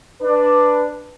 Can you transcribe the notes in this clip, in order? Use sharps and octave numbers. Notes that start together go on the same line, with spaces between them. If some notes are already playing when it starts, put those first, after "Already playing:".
D4 B4